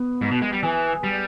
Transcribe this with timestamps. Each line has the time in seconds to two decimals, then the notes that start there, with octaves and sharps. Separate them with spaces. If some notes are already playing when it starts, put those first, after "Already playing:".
Already playing: B3
0.22 G#2
0.31 B2
0.42 G#3
0.52 G3
0.63 E3 G#4
1.04 G3